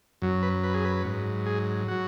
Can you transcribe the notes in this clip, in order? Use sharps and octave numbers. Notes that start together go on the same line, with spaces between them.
F#2 F#3
B4
B4
G#4
B4
G#2 F#3
G#4
F#3 F#4